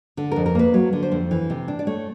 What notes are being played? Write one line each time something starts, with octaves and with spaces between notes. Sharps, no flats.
D3 A4
F2 A#4
A#4
A#3 B4
F#3
D3
C5
F2
E3
C3
D4
D5
A3 C#5